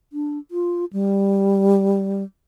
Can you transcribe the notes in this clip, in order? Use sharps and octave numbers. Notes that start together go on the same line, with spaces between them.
D4
F4
G3